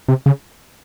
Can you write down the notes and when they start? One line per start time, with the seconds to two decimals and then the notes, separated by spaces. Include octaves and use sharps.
0.08 C3
0.26 C#3